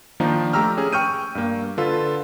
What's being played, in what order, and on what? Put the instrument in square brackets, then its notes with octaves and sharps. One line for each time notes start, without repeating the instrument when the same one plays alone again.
[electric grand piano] D#3 F3 A#3 D4 D#4
A3 G4 A#5 E6 F6
C#4 G#4
G5 C#6 F6 G6 D#7
G2 A#3
D3 F4 A4 B4